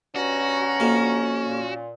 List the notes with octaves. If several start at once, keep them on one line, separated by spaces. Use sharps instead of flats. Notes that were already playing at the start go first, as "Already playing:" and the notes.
G2 B2 C#4 F#4 A#5
F2 A#3
A#2